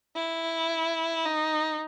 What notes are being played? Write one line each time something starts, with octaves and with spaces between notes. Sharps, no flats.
E4
D#4